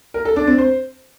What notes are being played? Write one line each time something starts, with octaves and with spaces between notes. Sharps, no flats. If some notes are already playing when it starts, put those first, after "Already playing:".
A#4
A4
D4
C4
C5